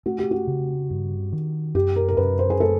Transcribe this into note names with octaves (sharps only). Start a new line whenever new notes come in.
A3 F#4
G4
F#4
C#3
G2
D#3
F#2 G4
A#4
A#4
F#2 B4
C5
G#4
A3 A4